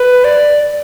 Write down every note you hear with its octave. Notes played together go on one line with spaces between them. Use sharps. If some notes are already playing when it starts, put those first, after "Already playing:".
Already playing: B4
D5